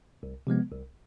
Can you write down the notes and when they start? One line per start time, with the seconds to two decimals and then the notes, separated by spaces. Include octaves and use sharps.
0.23 C2
0.47 C3 F3 G#3 B3
0.72 C2